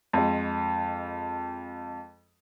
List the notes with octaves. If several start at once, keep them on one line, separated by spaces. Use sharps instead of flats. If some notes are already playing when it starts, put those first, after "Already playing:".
F2 G#3